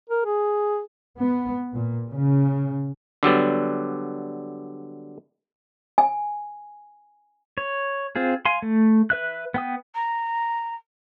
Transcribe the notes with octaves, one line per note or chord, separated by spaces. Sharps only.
A#4
G#4
B3
A#2
C#3
D3 F#3 G3 B3
G#5
C#5
C4 F4 G#4
F5 G#5 C6
A3
B4 E5 F#6
B3 G5 D#6
A#5